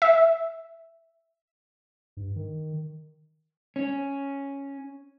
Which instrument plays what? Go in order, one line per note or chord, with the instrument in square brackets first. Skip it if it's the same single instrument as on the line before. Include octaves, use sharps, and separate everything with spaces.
[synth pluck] E5
[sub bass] G2
D#3
[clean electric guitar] C#4